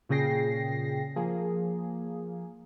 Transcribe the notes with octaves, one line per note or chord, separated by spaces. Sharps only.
A#2 C#3 G#4 G5 A#6 C7
F3 A#3 G#4